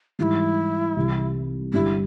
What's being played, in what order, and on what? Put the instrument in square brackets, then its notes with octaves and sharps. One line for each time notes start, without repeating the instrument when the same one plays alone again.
[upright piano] G#2 E3 G3 [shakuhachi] E4 F4
[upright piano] C2 C3 E3
[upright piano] G1 G2 G3 [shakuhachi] E4